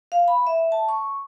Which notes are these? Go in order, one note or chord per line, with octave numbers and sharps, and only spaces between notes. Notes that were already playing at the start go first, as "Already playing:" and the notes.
F5
B5
E5
A5
C#6